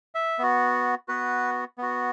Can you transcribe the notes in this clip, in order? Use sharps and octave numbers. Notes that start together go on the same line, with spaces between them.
E5
B3 F#4
B3 F#4 B4
B3 F#4